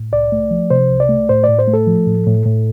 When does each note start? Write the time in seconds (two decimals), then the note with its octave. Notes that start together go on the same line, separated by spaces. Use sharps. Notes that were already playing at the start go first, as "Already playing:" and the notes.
Already playing: A2
0.12 C2 D5
0.32 A3
0.51 F3
0.70 C3 C5
0.90 C2
1.00 D5
1.09 A3
1.29 A2 C5
1.44 A2 D5
1.59 C5
1.68 A3
1.74 A4
1.87 F3
2.07 A2
2.27 A2
2.46 A2